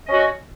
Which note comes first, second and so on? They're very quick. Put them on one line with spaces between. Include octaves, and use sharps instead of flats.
D#5 C#4 F#4